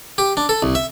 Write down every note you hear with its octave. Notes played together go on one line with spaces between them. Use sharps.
G4
D4
A4
C2
E5